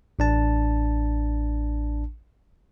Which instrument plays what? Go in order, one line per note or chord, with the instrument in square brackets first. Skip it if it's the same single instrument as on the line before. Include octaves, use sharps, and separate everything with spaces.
[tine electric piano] A1 D4 A5